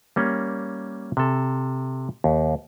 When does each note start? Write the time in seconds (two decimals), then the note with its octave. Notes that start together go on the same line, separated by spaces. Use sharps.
0.16 G3 A#3 C#4
1.17 C3 A4
2.24 D#2